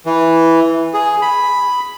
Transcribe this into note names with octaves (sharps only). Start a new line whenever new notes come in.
E3
G#4
B5